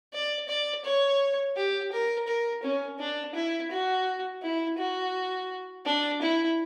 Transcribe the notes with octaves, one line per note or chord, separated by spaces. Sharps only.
D5
D5
C#5
G4
A#4
A#4
C#4
D4
E4
F#4
E4
F#4
D4
E4